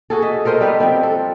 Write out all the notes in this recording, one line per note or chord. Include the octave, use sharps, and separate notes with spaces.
F#4 G#4 A4
D#5 E5
A4 A#4 C5 D#5
G3 B3 D#4 B4
F3 C4
A4